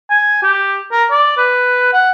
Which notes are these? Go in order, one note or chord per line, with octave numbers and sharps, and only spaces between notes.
G#5
G4
A#4
D5
B4
F#5